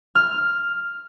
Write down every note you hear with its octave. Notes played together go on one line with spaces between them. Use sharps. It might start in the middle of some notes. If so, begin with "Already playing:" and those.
F6